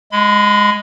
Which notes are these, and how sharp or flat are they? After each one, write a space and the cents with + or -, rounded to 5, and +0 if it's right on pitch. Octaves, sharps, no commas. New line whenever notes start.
G#3 +0 B5 +40